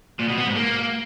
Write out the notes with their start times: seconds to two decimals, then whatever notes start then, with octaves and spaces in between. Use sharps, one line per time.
0.19 A#2
0.28 B2
0.37 B3
0.47 G#2
0.56 A#3